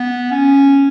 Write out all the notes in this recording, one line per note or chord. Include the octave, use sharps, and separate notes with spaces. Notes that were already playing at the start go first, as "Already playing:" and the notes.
Already playing: B3
C#4